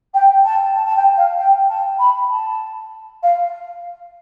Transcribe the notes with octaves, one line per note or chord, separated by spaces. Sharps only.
G5
A5
A5
A5
G5
F5
G5
A5
B5
A5
F5